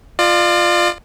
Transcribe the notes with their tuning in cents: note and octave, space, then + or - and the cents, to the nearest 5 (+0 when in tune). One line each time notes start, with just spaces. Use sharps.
F4 +0 D5 +40